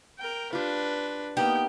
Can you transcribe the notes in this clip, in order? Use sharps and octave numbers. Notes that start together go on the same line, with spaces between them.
A#4 G5
D4 F4 G4 B4
A#3 B3 D#4 G4 G5